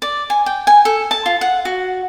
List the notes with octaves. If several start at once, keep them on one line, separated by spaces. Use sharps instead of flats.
D5
G#5
G5
G#5
A4
A5
F4
F#5
F#4